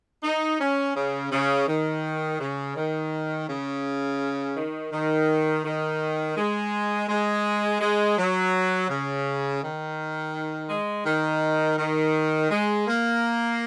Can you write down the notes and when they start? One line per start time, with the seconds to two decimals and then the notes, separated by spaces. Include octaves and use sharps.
0.23 D#4
0.59 C#4
0.96 C#3
1.32 C#3
1.68 D#3
2.40 C#3
2.76 D#3
3.48 C#3
4.57 D#3
4.92 D#3
5.65 D#3
6.37 G#3
7.09 G#3
7.81 G#3
8.18 F#3
8.89 C#3
9.62 D#3
10.70 G#3
11.06 D#3
11.78 D#3
12.51 G#3
12.87 A#3